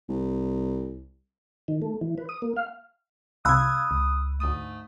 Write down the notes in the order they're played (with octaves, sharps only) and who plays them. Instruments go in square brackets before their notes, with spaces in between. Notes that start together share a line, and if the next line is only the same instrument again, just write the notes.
[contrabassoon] C2
[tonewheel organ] D#3
A3
E3
B4
D#6
A#3
F5
[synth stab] C2 C3 [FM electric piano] F5 G#6 [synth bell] B5 E6 F#6 [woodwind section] D#6
[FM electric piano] C#2
[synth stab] D2 D#6 [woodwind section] G#2 A3